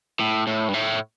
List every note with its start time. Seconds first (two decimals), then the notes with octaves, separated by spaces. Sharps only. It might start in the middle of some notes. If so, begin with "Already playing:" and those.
0.20 A2
0.47 A2
0.68 G2
0.74 A2